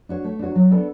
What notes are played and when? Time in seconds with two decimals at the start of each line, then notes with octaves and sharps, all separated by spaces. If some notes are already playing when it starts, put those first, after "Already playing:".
0.09 D4 F#4 C#5
0.25 A3
0.39 D4 F#4 C#5
0.56 F#3
0.71 B3 D4 A4 D5